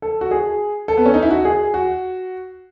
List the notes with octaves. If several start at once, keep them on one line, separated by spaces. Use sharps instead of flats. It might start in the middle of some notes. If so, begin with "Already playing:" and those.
A4
F#4
G#4
A4
B3
C#4
D#4
E4
F#4
G#4
F#4